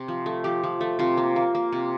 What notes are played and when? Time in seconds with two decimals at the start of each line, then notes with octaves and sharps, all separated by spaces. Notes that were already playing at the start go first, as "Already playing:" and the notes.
Already playing: C3
0.08 F3
0.26 A3
0.44 F3 G4
0.64 F3
0.81 A3
0.99 C3 F4
1.17 A#3
1.36 A#3
1.55 A#3
1.72 C3